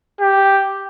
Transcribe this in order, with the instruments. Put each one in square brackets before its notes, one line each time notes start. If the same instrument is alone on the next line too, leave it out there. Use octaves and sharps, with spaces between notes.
[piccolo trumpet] G4